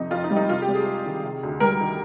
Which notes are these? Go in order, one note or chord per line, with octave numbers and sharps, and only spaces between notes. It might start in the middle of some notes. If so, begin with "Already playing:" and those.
Already playing: F2 C3 D#4
F2 F4
D#4
G3
D#4
C3 F4
G4
C2
G#4
G#3
D#3
C3
D2
G3 A#4
D#3